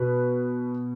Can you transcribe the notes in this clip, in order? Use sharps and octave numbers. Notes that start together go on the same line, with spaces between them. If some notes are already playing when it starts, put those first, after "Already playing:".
Already playing: B2 B4